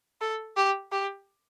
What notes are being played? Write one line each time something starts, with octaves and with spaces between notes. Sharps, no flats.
A4
G4
G4